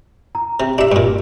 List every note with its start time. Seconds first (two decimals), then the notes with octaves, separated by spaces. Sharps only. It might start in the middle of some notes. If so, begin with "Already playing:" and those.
0.35 A#5
0.60 C3
0.78 D4 G4 E5
0.92 G2 A#2